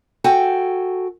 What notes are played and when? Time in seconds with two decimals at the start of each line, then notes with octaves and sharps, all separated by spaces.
0.24 F#4 A4 G5 G#5